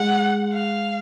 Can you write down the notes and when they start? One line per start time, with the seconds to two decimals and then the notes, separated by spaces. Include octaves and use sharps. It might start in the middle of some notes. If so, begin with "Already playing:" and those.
Already playing: G#3 F#5
0.53 F5